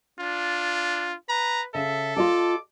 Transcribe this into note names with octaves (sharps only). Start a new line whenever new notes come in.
D4 F4
B4 A#5
C#3 A4 E5
F4 D#5 A5 D6